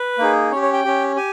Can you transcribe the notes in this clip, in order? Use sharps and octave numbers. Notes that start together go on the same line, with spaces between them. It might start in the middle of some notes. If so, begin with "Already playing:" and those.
Already playing: B4
A#3 D#4 G#4
C#4 G4 C#5
C#5
G5
C#4 G4
G4 G#5